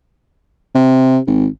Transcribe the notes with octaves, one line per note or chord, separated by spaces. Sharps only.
C3
G#1